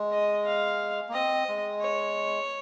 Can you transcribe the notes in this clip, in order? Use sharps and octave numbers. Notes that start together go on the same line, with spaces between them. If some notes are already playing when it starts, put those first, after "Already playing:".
Already playing: G#3
D#5
F5
A#3
C4 D#5
G#3
C#5